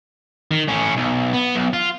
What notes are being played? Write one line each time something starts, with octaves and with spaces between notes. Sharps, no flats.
D#3
A2 C#4
B1
B3
B1
F4